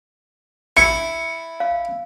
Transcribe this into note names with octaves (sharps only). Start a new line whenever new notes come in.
E4 C#7
F5